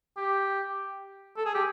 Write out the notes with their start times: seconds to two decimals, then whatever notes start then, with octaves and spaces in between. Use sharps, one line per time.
0.17 G4
1.37 A4
1.46 G#4
1.55 G4